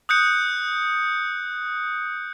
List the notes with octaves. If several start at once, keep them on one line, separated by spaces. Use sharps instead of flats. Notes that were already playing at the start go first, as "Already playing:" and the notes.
D#6 F#6 G6 C#7